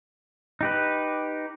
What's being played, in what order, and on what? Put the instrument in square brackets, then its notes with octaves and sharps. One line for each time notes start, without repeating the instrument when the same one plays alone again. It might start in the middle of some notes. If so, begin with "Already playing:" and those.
[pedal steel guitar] D#4 G4 B4